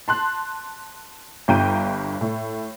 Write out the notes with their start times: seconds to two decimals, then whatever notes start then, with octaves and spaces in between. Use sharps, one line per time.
0.08 A5 C6 F#6
1.48 G1 G2 G5 A#5 G6 D#7
2.21 A2